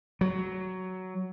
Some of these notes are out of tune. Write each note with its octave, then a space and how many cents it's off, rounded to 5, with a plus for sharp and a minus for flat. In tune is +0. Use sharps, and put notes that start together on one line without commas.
F#3 +10